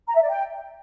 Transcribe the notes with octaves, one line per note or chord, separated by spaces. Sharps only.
A#5
E5
D5
G5